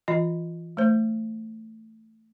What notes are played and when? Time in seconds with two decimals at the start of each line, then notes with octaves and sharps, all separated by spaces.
0.08 E3 F4 D#5
0.77 A3 C5